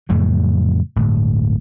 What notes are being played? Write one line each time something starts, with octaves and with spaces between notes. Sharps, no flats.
F2 A2 C#3 F#3
D1 G1 A2